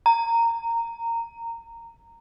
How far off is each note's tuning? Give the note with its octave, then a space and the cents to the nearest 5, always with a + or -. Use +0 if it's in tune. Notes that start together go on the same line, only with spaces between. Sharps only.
A#5 -15